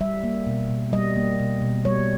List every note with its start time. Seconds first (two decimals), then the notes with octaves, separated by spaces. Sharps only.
0.01 G3 E5
0.24 A#3
0.47 B2
0.70 B2
0.93 G3 D#5
1.16 A#3
1.40 B2
1.62 B2
1.85 G3 C#5